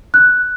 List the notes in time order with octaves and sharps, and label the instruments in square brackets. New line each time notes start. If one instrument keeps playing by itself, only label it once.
[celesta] F#6